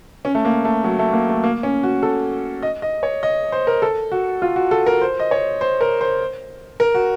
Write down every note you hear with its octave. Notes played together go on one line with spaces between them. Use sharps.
C#4
A3
A#3
A3
F#3
A3
A#3
A3
A#3
C#4
F#4
A4
D#5
D#5
C#5
D#5
C5
A#4
A4
F#4
F4
F#4
A4
A#4
C5
D#5
C#5
C5
A#4
C5
A#4
F#4